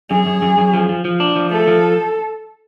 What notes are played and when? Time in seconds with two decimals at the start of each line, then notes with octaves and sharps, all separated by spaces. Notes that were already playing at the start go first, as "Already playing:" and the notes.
0.11 F#2 G#4
0.27 F#2
0.42 F#2
0.58 F#2
0.74 F3
0.89 F3
1.05 F3
1.20 D4
1.36 F3
1.51 A3 A4
1.67 F3